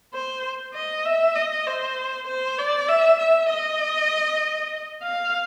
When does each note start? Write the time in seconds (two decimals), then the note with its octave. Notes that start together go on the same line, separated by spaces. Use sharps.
0.14 C5
0.75 D#5
1.06 E5
1.35 D#5
1.67 C5
2.27 C5
2.58 D5
2.89 E5
3.19 E5
3.50 D#5
5.03 F5